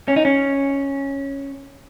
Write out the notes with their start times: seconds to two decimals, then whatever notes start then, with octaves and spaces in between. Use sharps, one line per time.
0.08 C#4
0.16 D#4
0.25 C#4